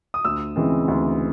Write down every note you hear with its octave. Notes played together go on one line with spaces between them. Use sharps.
D#6
D2 E6
C#3 E3 G#3 C4
D2